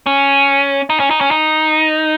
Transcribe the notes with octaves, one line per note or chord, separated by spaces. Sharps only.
C#4
D#4
C#4
D#4
C#4
D#4